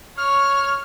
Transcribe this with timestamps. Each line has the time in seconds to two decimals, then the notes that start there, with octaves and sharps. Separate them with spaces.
0.18 C#5 F6